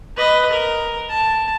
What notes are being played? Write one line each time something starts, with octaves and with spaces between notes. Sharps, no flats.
B4 D#5
A#4
A5